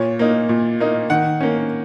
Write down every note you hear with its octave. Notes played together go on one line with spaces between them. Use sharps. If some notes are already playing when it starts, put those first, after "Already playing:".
Already playing: A#2 C#5
A#3 D#4
A#2
A#3 D#4
D#3 F#5
A#3 C#4